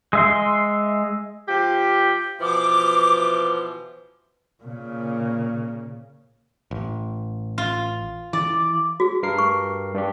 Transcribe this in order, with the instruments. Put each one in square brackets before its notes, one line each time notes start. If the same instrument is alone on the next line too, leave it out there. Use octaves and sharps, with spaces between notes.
[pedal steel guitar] G#3 E5 C6
[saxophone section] F3 G4
[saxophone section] B2 E3 F3 [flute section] D6
[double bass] A#2 C#3
[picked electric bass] A1
[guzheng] F4
[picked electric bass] E3 [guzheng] D5
[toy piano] F#4 G#4
[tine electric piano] G2 A#4 C7
[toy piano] C#6
[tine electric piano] G2 D4 G4